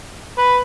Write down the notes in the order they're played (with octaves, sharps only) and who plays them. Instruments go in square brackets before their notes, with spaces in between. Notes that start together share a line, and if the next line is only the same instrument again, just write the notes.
[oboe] B4